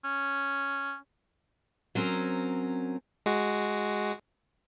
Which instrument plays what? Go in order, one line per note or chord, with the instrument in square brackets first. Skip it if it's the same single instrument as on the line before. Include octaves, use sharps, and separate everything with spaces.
[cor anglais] C#4
[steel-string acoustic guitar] F#3 C4 C#4 A#4
[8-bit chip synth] G#3 F#4